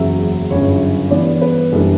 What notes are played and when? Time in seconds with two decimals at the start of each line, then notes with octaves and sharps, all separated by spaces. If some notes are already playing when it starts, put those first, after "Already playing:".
Already playing: F#1 E2 C#3 F#3 E5
0.50 G1 F#2 C#3 C#5
1.11 G2 E3 B3 D4 D5
1.41 B4
1.72 F#1 F#2 E3 G3 D4 A4